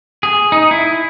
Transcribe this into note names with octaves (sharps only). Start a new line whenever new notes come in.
G#4
D#4
E4